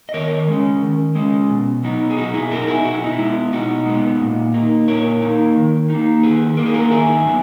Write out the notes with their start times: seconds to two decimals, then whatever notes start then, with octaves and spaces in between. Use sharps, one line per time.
0.09 D#5
0.14 D#3 A#4 C#5
0.48 G#3 C#4
0.82 D#3
1.15 G#3 C#4
1.49 B2
1.83 F#3 B3 D#4
2.10 G#4
2.17 B2 D#4 F#4
2.34 E4 G#4
2.51 F#3 B3 D#4 F#4 A#4
2.67 E4 G#4
2.85 B2 F#4
2.94 E4
3.03 D#4
3.13 E4
3.19 G#3 B3
3.52 B2 D#4 F#4
3.86 G#3 B3
4.21 A#2
4.54 A#3 D#4
4.88 A#2 A#4 C#5
5.22 A#3 D#4
5.56 D#3
5.90 A#3 D#4
6.23 D#3 G#4 B4
6.57 A#3 D#4 A#4
6.66 G#4
6.74 F#4 A#4
6.91 D#3 E4 G#4
7.25 F#3 B3